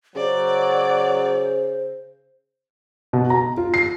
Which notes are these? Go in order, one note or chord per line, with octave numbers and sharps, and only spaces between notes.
C#3 F#3 C5 D5
B2
A#5
F4
C7